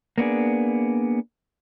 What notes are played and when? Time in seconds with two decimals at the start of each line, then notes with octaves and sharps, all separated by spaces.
0.18 A#3 B3 D4 G#4